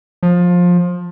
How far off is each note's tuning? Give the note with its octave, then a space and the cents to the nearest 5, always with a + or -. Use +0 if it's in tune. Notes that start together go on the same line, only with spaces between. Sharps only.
F3 +20